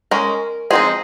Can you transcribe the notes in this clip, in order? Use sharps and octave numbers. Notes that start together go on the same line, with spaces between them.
G#3 C#4 A#4
F3 G#3 C4 D#4 G#4